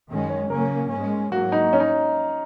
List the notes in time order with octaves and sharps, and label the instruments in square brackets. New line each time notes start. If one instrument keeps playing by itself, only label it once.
[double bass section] F#2 D#3 G#3 C#4
[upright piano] C#5
[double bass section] C#3 F#3 A#3 C#4 [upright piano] A#4
[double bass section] G#2 G#3 C#4
[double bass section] G#2 F#3 A#3 [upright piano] F#4
[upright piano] D#4
C#4
D#4